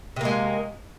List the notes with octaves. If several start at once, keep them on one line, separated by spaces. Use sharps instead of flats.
C3 G#3 A#3